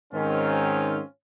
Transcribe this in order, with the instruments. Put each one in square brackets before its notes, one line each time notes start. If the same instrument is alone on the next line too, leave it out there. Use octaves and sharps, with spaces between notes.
[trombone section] G#2 D#3 [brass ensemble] C4 C#4 F4